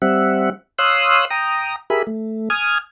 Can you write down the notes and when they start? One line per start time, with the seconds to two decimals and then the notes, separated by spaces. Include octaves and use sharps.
0.02 G3 C4 E5 F#5
0.78 C#5 F5 C6 D#6 E6 F#6
1.30 G5 A#5 D#6
1.90 G4 G#4 A#4 E5 G#5 B5
2.07 A3
2.50 G#5 D#6 F6 G#6